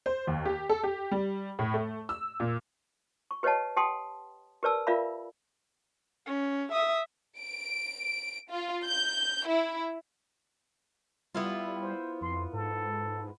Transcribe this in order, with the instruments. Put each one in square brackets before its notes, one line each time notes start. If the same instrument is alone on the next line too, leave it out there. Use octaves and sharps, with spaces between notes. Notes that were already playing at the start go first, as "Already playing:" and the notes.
[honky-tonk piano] C5
D#2
G4
A4
G4
G3
A2
A3
E6
A#2
[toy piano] C#6
G4 B4 C#5 D#5 F#5 A5
G4 F#5 G5 A5 C6 D#6
G4 A#4 B4 D5 A5 E6
F4 A#4 D5 E5 F5 B5
[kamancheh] C#4
E5 D#6
[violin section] D7
F4
G6
E4
[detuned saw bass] G3 [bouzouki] B3 E4 F4
[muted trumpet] C5
[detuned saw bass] F2 [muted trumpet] C6
[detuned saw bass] G#2 [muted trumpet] A4